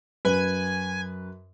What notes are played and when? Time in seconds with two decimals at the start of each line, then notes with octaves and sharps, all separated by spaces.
0.25 F#2 B4 G#5